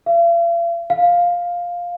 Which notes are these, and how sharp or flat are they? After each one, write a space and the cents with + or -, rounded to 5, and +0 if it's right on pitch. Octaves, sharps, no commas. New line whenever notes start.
F5 -45
F5 +5